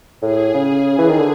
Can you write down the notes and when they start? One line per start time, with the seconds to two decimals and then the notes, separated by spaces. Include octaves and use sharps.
0.22 A2 G#4
0.55 C#3 G#4
0.99 E3
1.09 D#3
1.19 D3